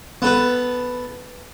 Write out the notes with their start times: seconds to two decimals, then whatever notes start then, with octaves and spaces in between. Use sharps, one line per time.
0.22 B3 A4 B4